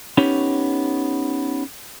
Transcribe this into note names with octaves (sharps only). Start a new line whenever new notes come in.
B3 C#4 D#4 G4 C#5